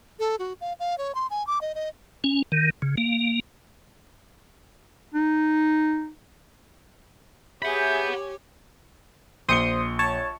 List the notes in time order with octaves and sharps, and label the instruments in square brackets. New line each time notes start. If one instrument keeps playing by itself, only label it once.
[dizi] A4
F#4
F5
F5
C#5
C6
G#5
D6
D#5
D#5
[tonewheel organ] C#4
D#3
C#3
A#3
[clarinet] D#4
[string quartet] G4 C#5 G#5 [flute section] G#4 E5 G6 [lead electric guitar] F#5 B5
[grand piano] A#1 C#7 G7 [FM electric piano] C5 C6 D#6
[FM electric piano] C#5 A5